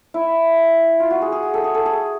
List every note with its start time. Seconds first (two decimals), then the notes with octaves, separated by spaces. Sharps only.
0.14 E4
1.00 F4
1.11 F#4
1.22 G#4
1.32 G#4
1.43 G#4
1.54 A4
1.64 G#4
1.75 A4
1.86 G#4